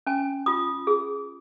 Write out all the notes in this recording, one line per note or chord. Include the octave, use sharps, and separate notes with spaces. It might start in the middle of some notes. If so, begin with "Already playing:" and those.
C#4 G#5
F4 D#6
G#4